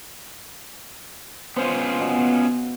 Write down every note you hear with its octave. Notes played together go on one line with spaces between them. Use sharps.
B3 C#4 F4 C5
B2